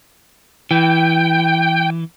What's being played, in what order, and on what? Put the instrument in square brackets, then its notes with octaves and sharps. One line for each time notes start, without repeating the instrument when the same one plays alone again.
[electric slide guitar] E3 [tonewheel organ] G5